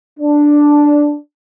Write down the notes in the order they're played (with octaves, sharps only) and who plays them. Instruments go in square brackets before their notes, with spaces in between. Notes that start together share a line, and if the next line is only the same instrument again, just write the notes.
[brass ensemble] D4